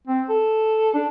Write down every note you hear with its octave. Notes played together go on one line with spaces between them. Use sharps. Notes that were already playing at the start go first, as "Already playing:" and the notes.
C4
A4
D4